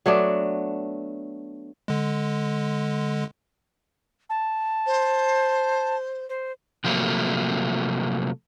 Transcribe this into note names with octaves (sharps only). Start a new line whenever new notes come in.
F#3 A3 B3 D4
D3 G#3
A5
C5
C5
C3 F3 F#3 A3 A#3